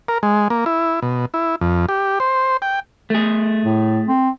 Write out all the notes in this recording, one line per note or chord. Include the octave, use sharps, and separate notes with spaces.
A#4
G#3
A#3
E4
B2
E4
F2
G4
C5
G5
A3 G#4
A2
C4